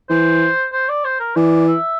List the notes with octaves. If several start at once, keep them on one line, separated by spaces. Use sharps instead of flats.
E3 C5
C5
D5
C5
A#4
E3 D5
E5